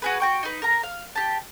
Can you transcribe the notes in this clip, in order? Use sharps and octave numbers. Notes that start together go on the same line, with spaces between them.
F#4 G#4 B4
F#4 G5 C#6
D#4 B4
A#4 A#5
F5
G4 A5